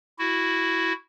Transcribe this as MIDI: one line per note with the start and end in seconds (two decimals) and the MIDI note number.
0.19 0.93 64
0.19 0.93 66